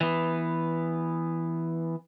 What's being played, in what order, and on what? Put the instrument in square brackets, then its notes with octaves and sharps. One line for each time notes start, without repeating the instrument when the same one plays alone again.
[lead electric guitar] E3 B3